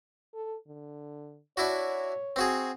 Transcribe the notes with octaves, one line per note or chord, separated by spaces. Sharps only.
A4
D3
D4 E4 F#4 C#5
C4 F#4 G#4